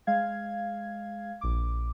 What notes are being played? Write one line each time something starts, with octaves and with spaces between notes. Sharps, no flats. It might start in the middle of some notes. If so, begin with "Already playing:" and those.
G#3 F5 G#6
A#1 D6